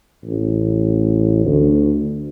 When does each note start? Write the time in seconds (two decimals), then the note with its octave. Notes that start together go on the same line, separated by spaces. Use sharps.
0.24 A1
1.45 D2